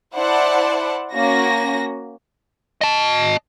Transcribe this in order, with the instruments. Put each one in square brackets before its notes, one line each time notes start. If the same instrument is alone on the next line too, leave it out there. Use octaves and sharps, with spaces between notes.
[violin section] E4 C5 D5 F#5 A5
A#3 C#4 F#4 A#6
[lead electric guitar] D#5 A5